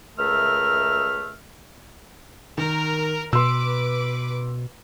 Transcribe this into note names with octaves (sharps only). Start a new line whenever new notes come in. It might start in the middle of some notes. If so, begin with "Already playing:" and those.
C#2 A3 A#4 E5 F6
D#3 A#4
B2 B4 C6 D6 E6